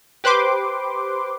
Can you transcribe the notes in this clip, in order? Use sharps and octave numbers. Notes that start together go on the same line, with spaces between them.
G4 B4 C5 C6 D6